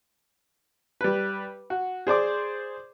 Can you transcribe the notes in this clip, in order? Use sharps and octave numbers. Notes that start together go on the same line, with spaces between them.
G3 B4
F#4
G#4 C5 D5 D6